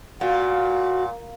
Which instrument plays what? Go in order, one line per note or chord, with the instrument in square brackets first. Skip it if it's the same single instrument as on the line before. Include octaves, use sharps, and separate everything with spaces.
[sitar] A#2 [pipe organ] F#4